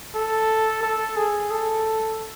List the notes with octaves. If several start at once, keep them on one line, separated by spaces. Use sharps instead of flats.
A4
A4
G#4
A4